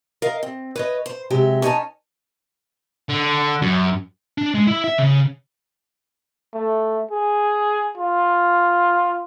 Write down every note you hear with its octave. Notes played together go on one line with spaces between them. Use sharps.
A#4 D#5 F5
C4
B4 C#5 D#5
C5
C3 F#3 G#3 G4
C#4 D#4 C#5 D#5 G#5 A5
D3
F#2
D4
G#3
E4
E5
C#3
A3
G#4
F4